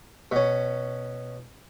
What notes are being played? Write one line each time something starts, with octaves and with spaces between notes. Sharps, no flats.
B2 C#4